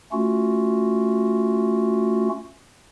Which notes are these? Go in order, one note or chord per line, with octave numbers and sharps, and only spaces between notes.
A3 C#4 F4 F#4